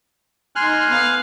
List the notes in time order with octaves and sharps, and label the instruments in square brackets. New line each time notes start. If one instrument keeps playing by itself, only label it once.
[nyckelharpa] D#4 C6 [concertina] G#5 F6 F#6
[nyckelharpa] B3 F5